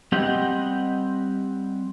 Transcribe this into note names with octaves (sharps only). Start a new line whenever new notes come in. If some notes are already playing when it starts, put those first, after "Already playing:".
G3 C4 G4 D#5 F#5 G5